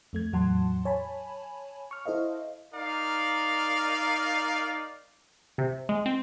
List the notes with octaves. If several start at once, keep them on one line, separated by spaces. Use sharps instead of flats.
F2 A3 G#6
E2 A2 F#3 F#5 A5 C6
C#5 G#5 A5 B5
C#6 F6
E4 A4 C5 D#5 F5
D#4 A#4 D5 F5
C3
G#3
C4